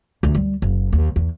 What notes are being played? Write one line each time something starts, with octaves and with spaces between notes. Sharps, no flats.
D2
G3
F#1
D#2
E2